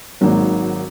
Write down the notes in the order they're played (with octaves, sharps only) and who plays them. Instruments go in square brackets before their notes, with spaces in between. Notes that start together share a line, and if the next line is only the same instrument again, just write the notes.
[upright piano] G#1 G#2 D#3 F#3 A#3